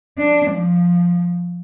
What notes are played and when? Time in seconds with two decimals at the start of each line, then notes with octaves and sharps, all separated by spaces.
0.18 D4
0.51 F3